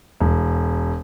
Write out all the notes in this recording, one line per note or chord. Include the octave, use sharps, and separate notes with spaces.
E1